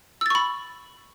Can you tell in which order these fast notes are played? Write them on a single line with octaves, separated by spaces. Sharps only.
E6 A6 C#6 B5